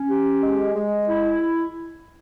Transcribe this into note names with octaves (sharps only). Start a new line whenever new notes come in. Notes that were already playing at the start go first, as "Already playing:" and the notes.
Already playing: C#4
G4
G#3
G#3
E4